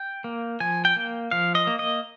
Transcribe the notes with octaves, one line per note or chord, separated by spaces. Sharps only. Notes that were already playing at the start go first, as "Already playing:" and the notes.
Already playing: G5
A#3
F3 G#5
G5
A#3
F3 F5
D#5
A#3
D#5